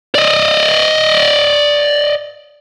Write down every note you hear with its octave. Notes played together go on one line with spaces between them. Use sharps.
D5 D#5